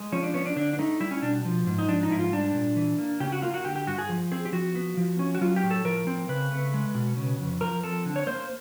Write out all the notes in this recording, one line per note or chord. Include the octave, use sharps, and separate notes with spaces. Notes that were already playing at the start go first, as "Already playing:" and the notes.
Already playing: G#3
F3 C#4
D4
B3 C#4
D4
D3 D4
D4
A3 D#4
G3 E4
C#4
B2 D4
F3
G#2
D#4
F3 D4
D#4
G#2 E4
F4
G3 D4
A#2
E3
A#3
C#3 G4
F#4
A#3 F4
F#4
D3 G4
G4
G2 F#4
G#4
F3
C4 G#4
G4
F3 F#4
B3
F3
C#4
F#4
F#3 F4
G4
A2
A4
F3 A#4
C4
C#3 B4
A3
G#3
B2
C#3
F2
F3 A#4
C4 A4
D3
C#5
A#3 C5